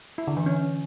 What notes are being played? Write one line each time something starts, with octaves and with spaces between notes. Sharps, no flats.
E4
D3
E3
C#4